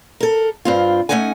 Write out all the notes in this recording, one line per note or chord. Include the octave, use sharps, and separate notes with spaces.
A4 A#4
G2 C4 F4
A3 B3 C#4 D#4 F#5 G#5